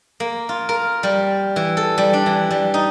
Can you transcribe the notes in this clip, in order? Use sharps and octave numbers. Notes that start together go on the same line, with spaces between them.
A#3
F4
A#4
G3
E3
A4
G3
D4
E3
G3
D#4